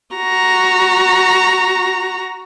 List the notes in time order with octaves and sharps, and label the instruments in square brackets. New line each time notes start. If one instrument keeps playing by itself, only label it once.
[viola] F#4 A#5